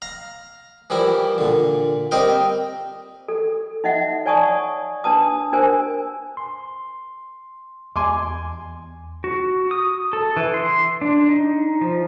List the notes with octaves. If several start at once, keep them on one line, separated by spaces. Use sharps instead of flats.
F5 A#5
E3 F3 G3 E4 A#4
A#2 D3
G3 C4 A#4 D#5 F5 G5
A4
D#4 D#5 E5 F#5
C#5 D5 G#5 A5 C#6 D#6
D4 B4 A5 D#6
D4 A#4 C5 G#5
C6
E2 G#5 C6 D6
F#4
D#6
A4
E3
C6
D4
D#4
F3